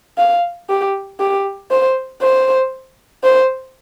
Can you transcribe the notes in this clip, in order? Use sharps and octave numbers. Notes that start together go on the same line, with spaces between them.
F5
G4
G4
C5
C5
C5